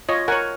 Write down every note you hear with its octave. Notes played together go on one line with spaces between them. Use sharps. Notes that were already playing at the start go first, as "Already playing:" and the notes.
F4 C#5 D#5
A#4 C#5 F#5 G#5